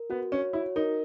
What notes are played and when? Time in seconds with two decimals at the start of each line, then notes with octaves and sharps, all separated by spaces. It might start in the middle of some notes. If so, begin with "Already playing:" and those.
Already playing: A#4
0.10 B3 F#4
0.32 C#4 C#5
0.53 E4 F#4
0.76 D#4 A#4